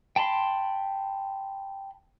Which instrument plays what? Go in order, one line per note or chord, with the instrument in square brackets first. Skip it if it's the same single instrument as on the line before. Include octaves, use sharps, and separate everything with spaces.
[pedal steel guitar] G5 A5 B5 C6